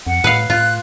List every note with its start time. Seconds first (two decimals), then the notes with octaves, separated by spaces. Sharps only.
0.07 F2 F#5
0.24 A2 B4 F5
0.50 A2 F4 F#6